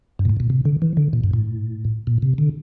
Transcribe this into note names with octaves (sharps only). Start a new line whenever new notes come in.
G2
A#2
A2
A#2
C3
D3
E3
D3
A#2
G2
A2
A#2
C3
D3